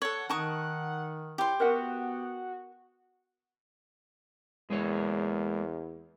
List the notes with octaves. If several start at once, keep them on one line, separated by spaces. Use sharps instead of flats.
A4 C#5 F#5
D#3 D#4 A#4 A5 C#6 D#6
E4 G4 C#5 C6
B3 F#4 A#4 E5 F#5
E2 G#3 A#3 C#5